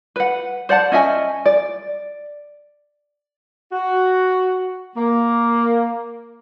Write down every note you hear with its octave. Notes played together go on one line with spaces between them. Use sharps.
B4 F#5
C5 D5 F#5 A5
C#4 D#5 E5 G#5
D5
F#4
A#3